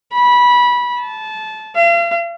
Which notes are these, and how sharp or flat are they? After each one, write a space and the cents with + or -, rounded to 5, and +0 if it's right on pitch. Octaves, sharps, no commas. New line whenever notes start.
B5 -20
A5 -20
F5 -40